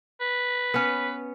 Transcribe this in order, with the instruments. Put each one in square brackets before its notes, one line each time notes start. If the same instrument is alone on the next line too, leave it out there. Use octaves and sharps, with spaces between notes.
[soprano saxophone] B4
[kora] B3 C#4